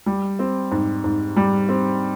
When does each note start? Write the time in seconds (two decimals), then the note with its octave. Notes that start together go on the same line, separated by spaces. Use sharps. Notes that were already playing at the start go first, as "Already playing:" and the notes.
0.06 G3
0.39 C4
0.71 G#2
1.04 G#2
1.36 G3
1.69 C4